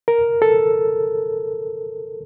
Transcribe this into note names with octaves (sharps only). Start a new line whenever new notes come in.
A#4
A4